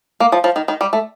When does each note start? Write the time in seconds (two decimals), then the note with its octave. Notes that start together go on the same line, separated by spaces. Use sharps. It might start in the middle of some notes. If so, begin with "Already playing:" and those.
0.20 A#3
0.32 F3
0.44 F3
0.56 D#3
0.68 D#3
0.81 G3
0.93 A3